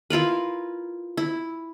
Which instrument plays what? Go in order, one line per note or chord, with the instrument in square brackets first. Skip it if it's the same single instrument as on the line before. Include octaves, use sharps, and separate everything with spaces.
[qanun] E4 F4 A#4 B4
E4